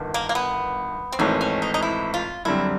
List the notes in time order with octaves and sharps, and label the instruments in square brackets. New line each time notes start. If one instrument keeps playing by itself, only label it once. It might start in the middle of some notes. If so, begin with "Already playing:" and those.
Already playing: [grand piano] G1 G2 D#3
[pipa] A#3
A#3
B3
C4
[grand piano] G#1 G#2 E3 A3 [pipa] C#4
[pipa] C#4
D#4
D#4
E4
F4
[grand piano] F#2 D3 G3 C4 [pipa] E4